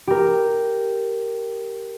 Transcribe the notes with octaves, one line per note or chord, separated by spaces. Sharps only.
G4 A#4